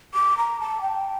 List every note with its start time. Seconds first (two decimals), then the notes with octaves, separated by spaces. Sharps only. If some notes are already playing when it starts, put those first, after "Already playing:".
0.14 D6
0.37 A#5
0.60 A5
0.82 G5